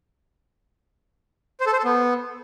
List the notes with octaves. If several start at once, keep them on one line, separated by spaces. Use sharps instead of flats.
C5
A4
C5
A4
B3